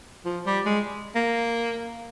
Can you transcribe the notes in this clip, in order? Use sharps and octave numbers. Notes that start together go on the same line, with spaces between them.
F3
G3
G#3
A#3